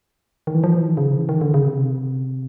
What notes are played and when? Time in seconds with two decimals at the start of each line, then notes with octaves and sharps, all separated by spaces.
0.47 D#3
0.55 E3
0.64 F3
0.75 E3
0.87 D#3
0.97 C#3
1.16 E3
1.29 D#3
1.41 D3
1.54 C#3
1.66 C3